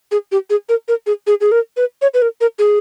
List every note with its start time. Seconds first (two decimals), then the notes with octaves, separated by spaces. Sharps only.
0.11 G#4
0.32 G4
0.50 G#4
0.69 A#4
0.88 A#4
1.07 G#4
1.27 G#4
1.41 G#4
1.52 A#4
1.77 B4
2.02 C#5
2.14 B4
2.22 A#4
2.41 A#4
2.59 G#4